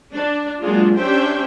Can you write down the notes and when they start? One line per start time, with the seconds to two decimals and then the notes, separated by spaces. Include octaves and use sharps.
0.13 D4
0.61 F#3 G#3 A#3 D4 F4
0.96 C#4 D4 G4 C5 E5 G5